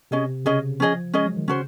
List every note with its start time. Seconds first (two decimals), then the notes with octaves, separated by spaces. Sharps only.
0.11 C3 C#4 G#4 D#5
0.45 C#3 C#4 G#4 D#5
0.80 F3 C#4 G#4 D#5
1.13 G#3 C#4 G#4 D#5
1.25 F#3
1.37 D#3
1.48 C#3 C#4 F#4 C5